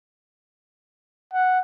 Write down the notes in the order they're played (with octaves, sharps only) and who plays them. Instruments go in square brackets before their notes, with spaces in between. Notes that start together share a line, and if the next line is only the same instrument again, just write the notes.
[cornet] F#5